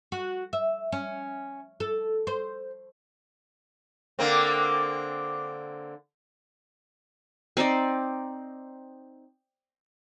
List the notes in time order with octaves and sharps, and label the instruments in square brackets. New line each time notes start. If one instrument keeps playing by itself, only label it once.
[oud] F#4
E5
C#4
A4
C5
[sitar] D3 A#3 C4
[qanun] C4 D#4 C5 D5